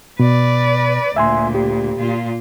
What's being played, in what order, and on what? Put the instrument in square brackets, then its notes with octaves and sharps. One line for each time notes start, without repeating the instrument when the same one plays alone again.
[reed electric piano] B2 [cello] B4 D5
[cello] D2 A#2 [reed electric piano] E5 G#5 C6
[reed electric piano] G4
[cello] A#2 F4